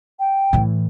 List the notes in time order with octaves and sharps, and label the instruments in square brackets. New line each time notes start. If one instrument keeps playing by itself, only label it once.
[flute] G5
[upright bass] A2 E3